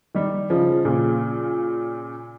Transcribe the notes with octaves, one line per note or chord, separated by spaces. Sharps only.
D#3 G3
C#3 F3
A#2 C#3